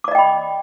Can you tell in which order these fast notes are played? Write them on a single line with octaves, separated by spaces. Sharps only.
D6 D5 D#5 G5 B5